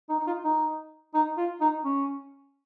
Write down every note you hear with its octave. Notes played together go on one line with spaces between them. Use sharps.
D#4
D#4
F4
D#4
D#4
F4
D#4
C#4